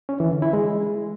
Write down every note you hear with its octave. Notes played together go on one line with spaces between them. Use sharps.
C#4
E3
D3
E4
G#3